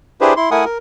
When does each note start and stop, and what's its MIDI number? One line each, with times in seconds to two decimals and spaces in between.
0.21 0.34 62
0.21 0.34 64
0.21 0.34 67
0.21 0.34 68
0.21 0.34 71
0.21 0.34 72
0.36 0.50 64
0.36 0.50 84
0.51 0.65 57
0.51 0.65 64
0.51 0.65 70
0.51 0.65 78
0.51 0.65 80
0.51 0.65 87
0.65 0.78 70